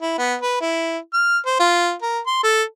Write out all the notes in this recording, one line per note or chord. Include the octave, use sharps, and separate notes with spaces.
E4
B3
B4
E4
F6
C5
F4
A#4
C6
A4